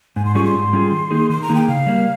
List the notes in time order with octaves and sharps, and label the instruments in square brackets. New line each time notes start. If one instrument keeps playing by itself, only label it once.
[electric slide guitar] G#2 [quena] G#5
[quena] C6
[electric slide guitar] G3 C#4 F4 G#4 [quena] C#6
[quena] C6
[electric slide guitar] G#2
G3 C#4 F4 G#4
D#3
A#3 D#4 G#4
[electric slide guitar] D#3 [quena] C6
[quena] A#5
[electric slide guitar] A#3 D#4 G#4
[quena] G5
[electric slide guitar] C#3 [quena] F5
[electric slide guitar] G3 A#3